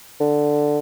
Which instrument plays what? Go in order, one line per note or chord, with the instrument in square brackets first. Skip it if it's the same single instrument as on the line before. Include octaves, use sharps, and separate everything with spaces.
[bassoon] D3